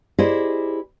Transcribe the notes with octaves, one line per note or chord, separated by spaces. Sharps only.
E4 G4 G#4 C5 D5 D#5